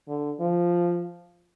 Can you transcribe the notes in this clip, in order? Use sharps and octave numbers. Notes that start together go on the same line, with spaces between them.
D3
F3